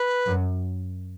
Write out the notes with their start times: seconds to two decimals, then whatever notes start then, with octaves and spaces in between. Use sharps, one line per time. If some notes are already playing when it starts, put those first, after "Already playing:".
Already playing: B4
0.26 F#2